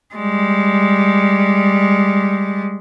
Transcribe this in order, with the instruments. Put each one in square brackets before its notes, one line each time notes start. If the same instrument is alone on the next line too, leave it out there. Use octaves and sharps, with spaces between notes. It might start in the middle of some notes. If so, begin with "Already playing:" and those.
[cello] G3 G#3